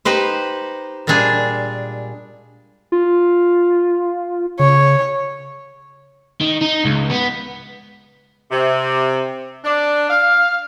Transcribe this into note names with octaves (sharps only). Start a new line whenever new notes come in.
D#4 G4 B4 C5
A#2 G3 G#3 D4 G#4
F4
C#3 C#5
D#3
D#4
C#2
B3
C3
D4
F5